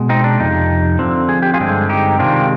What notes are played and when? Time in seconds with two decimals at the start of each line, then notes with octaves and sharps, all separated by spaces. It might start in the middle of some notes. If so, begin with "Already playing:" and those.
Already playing: B2 G#3
0.09 C4 D#4
0.24 D4
0.39 F2 C3 D#4
0.99 D3 F3 C4
1.29 G#4
1.42 G4
1.54 F4 G#4
1.60 G2 D3 G#3 C4
1.89 D#4 G4
2.19 C3 D#3 G#3 C4 D4 F4